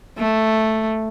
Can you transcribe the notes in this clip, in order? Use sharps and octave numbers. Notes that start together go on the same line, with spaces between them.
A3